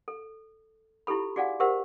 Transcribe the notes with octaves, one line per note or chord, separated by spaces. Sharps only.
A4
E4 F4 G4 A4 B5
F#4 G#4 D5 F5 F#5 G#5
G4 A#4 C5 F#5